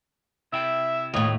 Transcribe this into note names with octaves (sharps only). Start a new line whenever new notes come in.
C3 E4 E5 G5
D#2 A2 F4 C#5 D#5